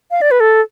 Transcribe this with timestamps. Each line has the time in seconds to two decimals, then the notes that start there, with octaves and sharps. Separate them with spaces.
0.11 F5
0.22 D5
0.31 B4
0.40 A4